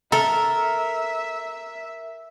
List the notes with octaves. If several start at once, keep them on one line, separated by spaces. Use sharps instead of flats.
A4 A#4 E5